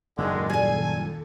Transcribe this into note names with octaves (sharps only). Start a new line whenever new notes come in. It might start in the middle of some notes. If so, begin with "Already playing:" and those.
F#1 D#2 A#2 D3 D#3 G#3 A4
G3 G#4 G#5